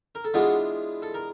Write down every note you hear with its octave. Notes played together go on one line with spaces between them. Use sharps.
A#4
A4
E3 G#3 B3 D4 F4 F#4 G#4
A4
A#4